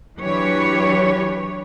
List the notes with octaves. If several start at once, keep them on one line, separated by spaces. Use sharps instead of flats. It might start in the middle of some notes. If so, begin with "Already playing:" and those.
E3 F#3 D4 G4 B4 C#5